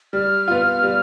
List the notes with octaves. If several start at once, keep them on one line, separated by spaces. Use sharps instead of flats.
G3 F6
B3 F4
G3